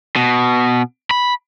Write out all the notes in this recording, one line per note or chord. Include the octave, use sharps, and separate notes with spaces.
B2
B5